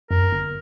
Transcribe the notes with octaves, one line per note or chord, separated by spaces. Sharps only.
F#2 A#4
G1